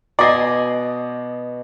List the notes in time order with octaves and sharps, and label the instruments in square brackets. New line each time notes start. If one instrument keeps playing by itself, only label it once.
[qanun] B2 G#5 C6 [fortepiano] D5 D#5